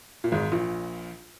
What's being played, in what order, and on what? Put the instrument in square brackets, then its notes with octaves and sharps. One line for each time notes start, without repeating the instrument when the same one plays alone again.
[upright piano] A#2
G#1 G#2
A#1 A#2